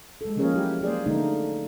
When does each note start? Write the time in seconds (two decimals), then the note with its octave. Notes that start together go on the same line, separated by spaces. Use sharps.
0.21 G#3 A4
0.37 F3 A#3 C#4 G#4 A#4 C#5
0.54 F#3 E4 G4
0.81 A#3 G#4 C5 D5
1.06 D3 A3 A#3 D#4